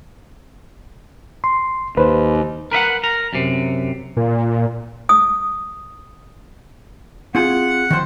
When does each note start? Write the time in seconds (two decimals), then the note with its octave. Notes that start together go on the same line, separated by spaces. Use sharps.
1.44 C6
1.97 D#2 B4 C5
2.71 A#4 B4 E5 F#5
3.04 A#4
3.33 F#2 C3
4.17 A#2
5.09 D#6
7.35 C4 F4 G#4 F#5
7.90 D#3 F3 C5